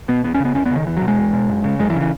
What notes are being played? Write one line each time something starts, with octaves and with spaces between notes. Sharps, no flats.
B2 B3
E2 B3
C#4
C#3
B3
E2 C#4
B3
C#3
D#3
E2 E3
F#3
B2
G#3
E2
B2
F#2
C#3
F#2 G#3
E3
C#3
E3